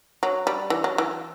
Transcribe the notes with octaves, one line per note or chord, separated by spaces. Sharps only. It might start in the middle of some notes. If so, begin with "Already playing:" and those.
F#3
G3
E3
F#3
E3